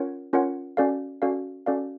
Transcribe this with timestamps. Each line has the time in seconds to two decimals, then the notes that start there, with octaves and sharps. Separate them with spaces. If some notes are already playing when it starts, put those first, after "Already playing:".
Already playing: C#4 F4 A#4 C#5 F#5
0.33 C#4 F4 A#4 C#5 F#5
0.77 C#4 F#4 A4 D5 F5
1.22 C#4 F#4 A4 D5 F5
1.66 C#4 F#4 A4 D5 F5